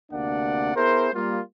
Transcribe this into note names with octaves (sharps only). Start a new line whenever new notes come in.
D2 C3 A#3 D4 D5 F#5
B3 E4 G#4 A#4 C5
G3 A#3 F4